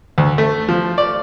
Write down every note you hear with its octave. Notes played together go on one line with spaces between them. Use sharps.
D2
A3
F3
D5